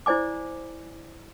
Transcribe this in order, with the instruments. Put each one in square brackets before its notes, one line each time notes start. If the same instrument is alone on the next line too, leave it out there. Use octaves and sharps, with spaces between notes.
[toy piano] E4 C5 D5 G#5 D6